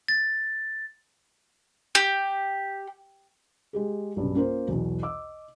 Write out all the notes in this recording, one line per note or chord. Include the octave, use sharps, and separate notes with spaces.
A6
G4
G#3 G4 G#4
B1 G2 C#3
A#3 C#4 F4 A#4 C5
B1 E2 B2
D#5 D6 E6